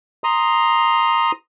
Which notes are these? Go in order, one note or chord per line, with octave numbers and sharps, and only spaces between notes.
A#5 C6 D#6